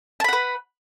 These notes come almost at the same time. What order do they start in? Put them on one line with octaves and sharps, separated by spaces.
A5 B5 F#5 B4